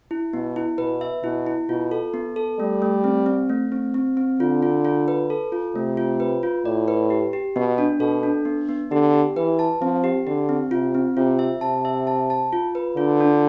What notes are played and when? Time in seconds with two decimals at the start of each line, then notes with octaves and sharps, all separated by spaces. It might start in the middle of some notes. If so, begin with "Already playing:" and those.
0.11 E4
0.33 B2 B3
0.56 E4
0.78 B2 B4
1.01 E5
1.23 B2 E4
1.47 E4
1.69 B2 F4
1.91 A4
2.14 B3
2.36 A4
2.59 G3 A3
2.82 A3
3.04 C4
3.26 C4
3.49 A3
3.72 C4
3.94 C4
4.17 C4
4.40 D3 F4
4.62 F4
4.85 F4
5.08 B4
5.30 A4
5.52 F4
5.75 C3 A3
5.97 F4
6.20 B4
6.43 F4
6.65 A2 D5
6.88 B4
7.10 G4
7.33 G4
7.56 B2 B3
7.78 D4
8.00 B2 A4
8.23 D4
8.45 B3
8.69 B3
8.91 D3 G4
9.14 G4
9.36 E3 B4
9.59 A5
9.81 F3 C4
10.04 G4
10.27 D3 G4
10.49 C4
10.71 C3 F4
10.95 C4
11.17 C3 F4
11.39 E5
11.61 C3 A5
11.85 E5
12.07 A5
12.30 A5
12.53 F4
12.75 B4
12.97 D3 F4
13.20 D4